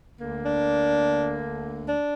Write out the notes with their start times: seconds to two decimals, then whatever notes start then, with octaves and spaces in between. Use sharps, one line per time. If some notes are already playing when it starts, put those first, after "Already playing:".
0.16 D2 D3 A#3
0.44 D4
1.87 D4